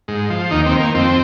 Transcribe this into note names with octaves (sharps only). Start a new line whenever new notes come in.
G#2
F3
D#2 D#4
C4
D#3
A#3
F2 C4